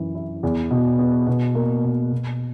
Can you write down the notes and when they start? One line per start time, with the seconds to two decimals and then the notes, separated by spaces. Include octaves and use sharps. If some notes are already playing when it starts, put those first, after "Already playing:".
Already playing: F#2 E3
0.15 E4
0.43 E2
0.71 B2
0.99 B3
1.27 B2
1.55 A#3
1.84 B2
2.12 B2